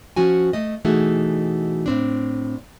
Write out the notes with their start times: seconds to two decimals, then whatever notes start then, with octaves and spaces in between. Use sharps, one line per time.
0.16 F3 C#4 F#4 G#5
0.53 A3 D#5
0.84 B2 E3 A3 D#4 F#4 G#4
1.86 A2 C4 D4